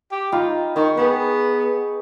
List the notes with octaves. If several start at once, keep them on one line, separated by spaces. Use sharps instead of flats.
G4
D#4 F4 G5 B5
D#3 G5 C#6
B3 G#4 B4